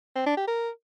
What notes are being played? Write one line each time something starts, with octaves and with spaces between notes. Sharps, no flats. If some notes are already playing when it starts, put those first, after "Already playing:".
C4
D4
G4
A#4